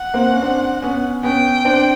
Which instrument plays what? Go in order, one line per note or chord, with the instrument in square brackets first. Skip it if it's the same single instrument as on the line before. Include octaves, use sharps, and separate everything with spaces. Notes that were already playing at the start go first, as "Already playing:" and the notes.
Already playing: [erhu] F#5
[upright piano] A#3 C4
C#4
C4 D4
B3 C#4
[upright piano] B3 C#4 [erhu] G5
[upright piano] C4 D4